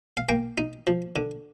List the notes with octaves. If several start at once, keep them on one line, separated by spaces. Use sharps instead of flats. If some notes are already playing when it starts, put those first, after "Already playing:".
F5
A#3 G5
D#4
F3
D3